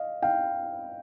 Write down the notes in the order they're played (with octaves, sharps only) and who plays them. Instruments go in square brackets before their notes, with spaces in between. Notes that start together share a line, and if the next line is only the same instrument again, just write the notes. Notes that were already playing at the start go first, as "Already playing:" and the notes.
Already playing: [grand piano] D#5 F5
F5 G5